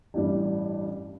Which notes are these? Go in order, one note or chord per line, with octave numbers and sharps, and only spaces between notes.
A1 G2 E3 G3